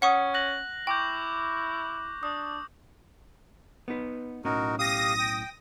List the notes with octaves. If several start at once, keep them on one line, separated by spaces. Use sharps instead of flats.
C#4 F#5 C#6 D#6
F#6 A#6 F#7
E4 G5 C#6 D6 G6
D4 D#6
B3 D#4 B4
B1 A2 C#4 D#4 F#4 A#4
G4 F5 D#6 A#6
G5